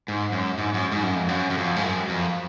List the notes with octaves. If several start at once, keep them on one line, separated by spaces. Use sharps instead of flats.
G#2
F#2
G#2
F#2
G#2
F#2
F2
F#2
F#2
F2
G#2
F#2
F2